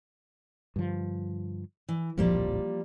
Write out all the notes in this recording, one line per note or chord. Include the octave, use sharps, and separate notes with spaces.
G2 D3 F3
E3
D1 A#1 F2 F3 G3 A#3